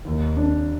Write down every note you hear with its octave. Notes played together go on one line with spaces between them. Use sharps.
D#2
D4